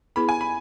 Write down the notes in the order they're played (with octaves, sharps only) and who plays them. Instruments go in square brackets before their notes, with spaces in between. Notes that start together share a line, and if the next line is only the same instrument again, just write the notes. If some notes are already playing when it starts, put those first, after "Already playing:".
[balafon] B3 E4 G#4 B4 [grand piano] B5
[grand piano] G#5
B5